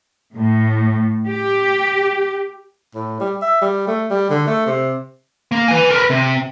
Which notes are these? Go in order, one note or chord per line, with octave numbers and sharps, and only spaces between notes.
A2
G4
A2
G3
E5
G3
A3
G3
D3
A3
C3
A#3
B4 G#5
A#4 B4
C3